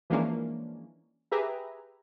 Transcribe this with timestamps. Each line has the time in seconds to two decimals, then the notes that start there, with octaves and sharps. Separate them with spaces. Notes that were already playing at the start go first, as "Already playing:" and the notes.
0.10 E3 F3 G#3 A#3 C#4 D4
1.31 G4 G#4 B4 E5 A#5